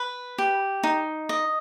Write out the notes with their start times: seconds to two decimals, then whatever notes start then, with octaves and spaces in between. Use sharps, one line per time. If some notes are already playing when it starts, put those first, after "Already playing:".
Already playing: B4
0.38 G4
0.83 D#4
1.29 D#5